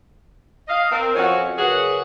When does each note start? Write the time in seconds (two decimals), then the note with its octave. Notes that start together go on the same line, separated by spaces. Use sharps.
0.68 D#5 F5
0.91 C4 A#4
1.15 F2 F3 C#4 F#4
1.58 F#2 C#3 F#4 G#4 B4 F#5